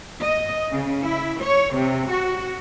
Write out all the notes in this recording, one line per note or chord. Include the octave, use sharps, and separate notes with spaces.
D#5
C#3
E4
C#5
C3
F#4